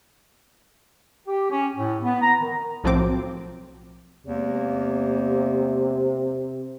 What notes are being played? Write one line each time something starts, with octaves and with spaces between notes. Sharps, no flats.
G4
C#4
A2
B3
A#5
D#3
B1 A2 F3 F#3 C4 D6
E2 C3 G#3 A#3